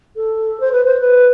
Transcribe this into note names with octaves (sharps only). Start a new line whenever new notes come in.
A4
C5
B4
C5
B4